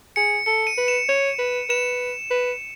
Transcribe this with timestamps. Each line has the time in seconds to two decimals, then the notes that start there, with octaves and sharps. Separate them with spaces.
0.16 G#4 C#7
0.46 A4 C#7
0.67 D#7
0.77 B4
0.88 E7
1.09 C#5
1.38 B4
1.69 B4 E7
2.30 B4